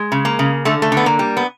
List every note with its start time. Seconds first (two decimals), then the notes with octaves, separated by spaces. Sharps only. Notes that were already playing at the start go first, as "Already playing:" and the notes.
Already playing: G#3
0.12 C#3
0.25 A#3
0.39 C#3
0.65 D3 A3
0.82 A3
0.92 D3
0.97 B3
1.06 A#3
1.19 G3
1.37 B3